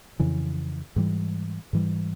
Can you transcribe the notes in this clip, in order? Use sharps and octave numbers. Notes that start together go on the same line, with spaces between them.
F2 C#3 E3
G#2 E3 G3
G#2 E3 G3